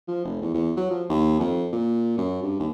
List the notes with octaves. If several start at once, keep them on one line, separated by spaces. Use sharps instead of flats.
F3
F1
E2
E2
F#3
F3
D#2
F2
A#2
F#2
G2
D#2